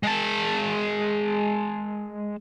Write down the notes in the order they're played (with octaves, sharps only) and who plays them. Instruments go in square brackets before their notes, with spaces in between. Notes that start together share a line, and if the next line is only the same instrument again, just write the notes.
[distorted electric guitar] G#3 A5